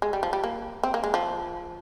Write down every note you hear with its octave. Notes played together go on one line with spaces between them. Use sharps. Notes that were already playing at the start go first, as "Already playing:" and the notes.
G#3
G3
F3
G3
A#3
C4
A#3
G#3
F3